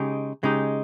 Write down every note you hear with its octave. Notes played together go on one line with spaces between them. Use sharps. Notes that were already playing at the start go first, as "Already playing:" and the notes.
Already playing: C#3 G#3 D#4 G4
C#3 G#3 D#4 G4